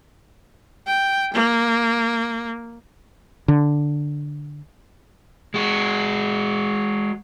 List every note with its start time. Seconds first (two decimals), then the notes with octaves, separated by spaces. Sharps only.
0.86 G5
1.33 A#3
3.48 D3
5.54 G#3 F#4